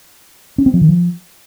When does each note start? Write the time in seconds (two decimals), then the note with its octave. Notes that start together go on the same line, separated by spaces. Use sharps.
0.58 C#4
0.66 C4
0.74 F3
0.81 D#3
0.89 F3